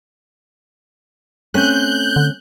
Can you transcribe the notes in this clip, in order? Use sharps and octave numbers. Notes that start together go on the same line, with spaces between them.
A3 C4 C#4 F#6 G6
D3